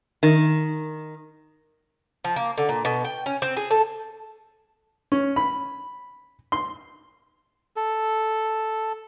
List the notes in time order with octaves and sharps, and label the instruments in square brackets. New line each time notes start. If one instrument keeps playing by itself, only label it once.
[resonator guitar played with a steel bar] D#3
[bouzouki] F3
A#3
D3
A#2
B2
G5
C#4
C4
G#4
A4
[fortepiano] C#4
B5
C6
[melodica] A4